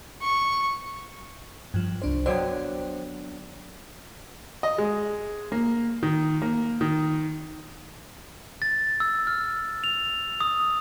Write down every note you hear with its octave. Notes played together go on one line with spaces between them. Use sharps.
C#6
G2 F3
C2 D4 C5
D3 F#3 B3 C5 G5
D#5
G#3
A#3
D#3
A#3
D#3
A6
E6
F6
F7
D#6